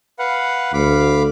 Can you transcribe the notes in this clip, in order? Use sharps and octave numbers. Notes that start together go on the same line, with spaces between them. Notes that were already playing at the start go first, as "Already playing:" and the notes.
B4 F5 F#5
D2 F5 B5 D6